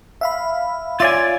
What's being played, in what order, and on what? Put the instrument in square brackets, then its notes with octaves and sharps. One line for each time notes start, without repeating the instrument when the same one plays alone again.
[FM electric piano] E5 F5 B5
[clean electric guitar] F4 D5 G#5 [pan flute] C#5 [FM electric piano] E5